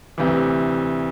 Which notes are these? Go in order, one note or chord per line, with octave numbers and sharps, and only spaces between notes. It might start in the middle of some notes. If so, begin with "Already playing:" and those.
D2 C3 E3